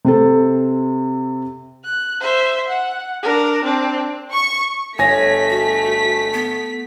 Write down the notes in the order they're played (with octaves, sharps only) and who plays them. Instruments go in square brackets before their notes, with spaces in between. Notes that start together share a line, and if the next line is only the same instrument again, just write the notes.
[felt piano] C3 C4 A4
[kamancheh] F#6
C5 E5
F#5
D4 A#4
C4 D4
[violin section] C#6
[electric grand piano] G1 G#5 A#6 [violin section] A3 B6 [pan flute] C#5
[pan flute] F#4
B3